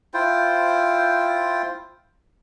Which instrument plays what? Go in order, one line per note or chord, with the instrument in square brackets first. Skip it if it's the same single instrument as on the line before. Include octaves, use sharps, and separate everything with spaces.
[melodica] E4 F4 C5 G5